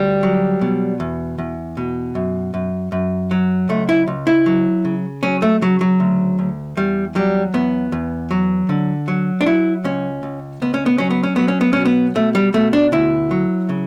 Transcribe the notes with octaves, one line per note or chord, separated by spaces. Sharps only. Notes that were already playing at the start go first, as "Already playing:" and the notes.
Already playing: D2 G3
F#3
B2
E2
E2
B2
F#2
F#2
F#2
F#3
C#2 A3
E4
C#2
E4
F#3
C#3
F#3 C#4
A3
C#3 F#3
F#3
D2
D2
E2 G3
F#3 G3
E2 B3
E2
F#3
D3
F#3
D4
F#3 E4
C#2 C#4
C#2
C#2 B3
C#4
B3
F#3 C#4
B3
C#4
F#3 B3
C#4
B3
B2 C#4
B3
B2 A3
G3
B2 A3
D4
D2 E4
F#3
C#3